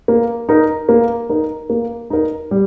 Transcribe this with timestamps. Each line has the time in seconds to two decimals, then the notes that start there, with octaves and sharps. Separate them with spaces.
0.08 A#3
0.49 D#4 A#4
0.89 A#3
1.29 D#4 A#4
1.70 A#3
2.10 D#4 A#4
2.51 G3